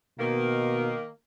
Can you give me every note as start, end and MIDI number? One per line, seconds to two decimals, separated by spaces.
0.19 0.94 47
0.19 1.08 51
0.19 1.08 58